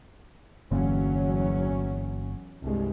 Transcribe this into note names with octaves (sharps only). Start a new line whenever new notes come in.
G1 E2 D3 F#3 A#3 C#4
C2 G2 G#3